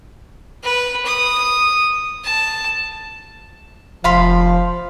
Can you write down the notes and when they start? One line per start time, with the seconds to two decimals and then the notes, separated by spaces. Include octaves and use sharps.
0.63 B4
1.06 D#6
2.24 A5
4.04 F1 F3 F5 B5 C6